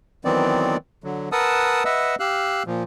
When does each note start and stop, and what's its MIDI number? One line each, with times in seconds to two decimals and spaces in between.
0.25 0.77 51
0.25 0.77 52
0.25 0.77 54
0.25 0.77 59
0.25 0.77 60
0.25 0.77 74
1.04 1.29 50
1.04 1.29 54
1.32 1.84 70
1.32 1.84 71
1.32 1.84 78
1.32 1.84 81
1.32 1.84 87
1.32 1.84 88
1.85 2.15 71
1.85 2.15 75
1.85 2.15 76
1.85 2.15 78
1.85 2.15 88
2.20 2.63 67
2.20 2.63 77
2.20 2.63 88
2.20 2.63 90
2.67 2.83 46
2.67 2.83 53